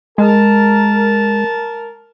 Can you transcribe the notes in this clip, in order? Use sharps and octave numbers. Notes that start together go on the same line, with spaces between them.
G#3 A#4 A5